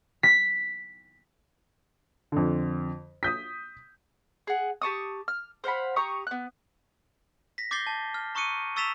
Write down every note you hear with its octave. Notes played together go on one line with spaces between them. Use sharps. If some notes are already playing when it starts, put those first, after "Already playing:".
B6
F2 D3
D#6 G6 B6
G#4 F#5
G4 A5 C#6 D#6
F6
C5 F5 F#5 B5
G4 A#5 C#6 D#6
B3 F#6
A#6 B6
D6 G6 A6 A#6 C7 G7
A5
F6
A#5 C#6 D#6 F#6 C#7 D#7
C#6 E6 A6 B6 E7 F7